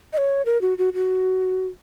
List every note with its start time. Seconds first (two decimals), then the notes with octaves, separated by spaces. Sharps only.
0.13 D#5
0.18 C#5
0.46 A#4
0.61 F#4
0.78 F#4
0.94 F#4